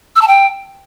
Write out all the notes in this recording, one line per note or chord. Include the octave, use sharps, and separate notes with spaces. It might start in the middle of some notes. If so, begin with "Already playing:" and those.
E6
A5
G5